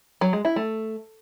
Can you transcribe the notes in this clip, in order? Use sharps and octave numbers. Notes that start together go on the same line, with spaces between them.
F#3
G#3
E4
A3